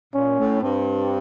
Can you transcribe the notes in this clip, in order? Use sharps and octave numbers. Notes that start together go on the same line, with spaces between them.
A#2 C#4
A2
G2 C4